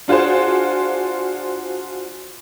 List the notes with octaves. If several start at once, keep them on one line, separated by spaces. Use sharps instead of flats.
D4 F4 F#4 G#4 C5